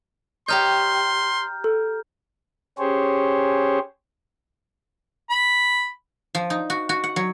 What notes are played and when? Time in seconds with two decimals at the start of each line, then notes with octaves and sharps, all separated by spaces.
0.48 G4 C#5 D#5 A#5 C6 F6 G6
1.64 A4
2.78 C#4 G4 G#4 C5 C#5
5.30 B5
6.35 F3
6.50 D#4
6.70 F#4
6.89 F#4
7.04 F#5
7.16 F#3